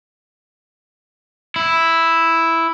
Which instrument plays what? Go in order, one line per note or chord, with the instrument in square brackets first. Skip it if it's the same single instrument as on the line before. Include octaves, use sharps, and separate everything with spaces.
[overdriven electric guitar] E4